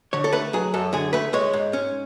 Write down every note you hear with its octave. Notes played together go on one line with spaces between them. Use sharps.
D3 C#5
A4
A3 B4
F#3 G#4
F#2 A4
D3 G#4
A3 B4
G#3 C#5
G#2
C#4